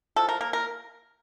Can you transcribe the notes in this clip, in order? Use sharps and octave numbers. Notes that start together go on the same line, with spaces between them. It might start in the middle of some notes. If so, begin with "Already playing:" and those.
F3 A4
A#4
A#3 A#4
A#4